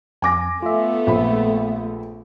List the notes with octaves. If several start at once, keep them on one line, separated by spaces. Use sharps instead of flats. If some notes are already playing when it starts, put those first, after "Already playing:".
F2 G#5 D6 A#6
A3 B3 F4 E5
A#1 B5